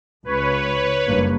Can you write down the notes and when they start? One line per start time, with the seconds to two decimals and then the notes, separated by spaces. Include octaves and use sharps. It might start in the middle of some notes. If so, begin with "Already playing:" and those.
0.25 C#2 B4 C#5
1.07 F#1 G2 A#3